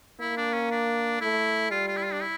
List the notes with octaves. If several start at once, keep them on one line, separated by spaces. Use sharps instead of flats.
A#3 E4
D4
C#4
D4
A3 E4
G3 F4
F4
E4
F4
D4
E4